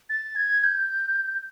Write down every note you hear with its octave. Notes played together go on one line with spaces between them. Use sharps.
A6
G#6
G6